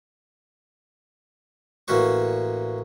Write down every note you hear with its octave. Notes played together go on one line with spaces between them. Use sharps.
A1 A#3 C#4 F#4 C5 C#6